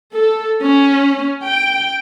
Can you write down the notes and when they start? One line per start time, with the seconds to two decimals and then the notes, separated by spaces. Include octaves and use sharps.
0.13 A4
0.63 C#4
1.44 G5